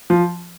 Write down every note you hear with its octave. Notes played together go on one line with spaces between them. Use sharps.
F3